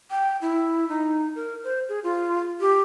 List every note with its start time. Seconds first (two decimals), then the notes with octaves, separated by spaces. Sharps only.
0.11 G5
0.42 E4
0.89 D#4
1.35 A#4
1.64 C5
1.89 G#4
2.04 F4
2.60 G4